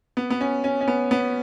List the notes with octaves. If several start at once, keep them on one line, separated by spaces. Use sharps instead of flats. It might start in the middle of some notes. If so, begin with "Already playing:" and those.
B3
B3
C#4
C#4
C#4
B3
B3